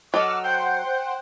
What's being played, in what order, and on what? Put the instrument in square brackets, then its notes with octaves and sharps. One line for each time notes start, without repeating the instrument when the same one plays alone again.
[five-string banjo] F#3 A4 D#5 [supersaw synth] F#5 E6 F6 [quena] D6
[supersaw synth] C5 F#5 [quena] G5 [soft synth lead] G6